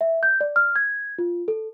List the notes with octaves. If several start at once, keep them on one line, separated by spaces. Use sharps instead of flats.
E5
G6
D5
F6
G#6
F4
A4